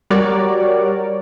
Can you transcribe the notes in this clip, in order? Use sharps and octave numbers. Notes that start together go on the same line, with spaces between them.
G3 F#4 A#4 C#5 D5